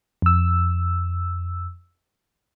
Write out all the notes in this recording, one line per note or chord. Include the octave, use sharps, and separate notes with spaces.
F2 E6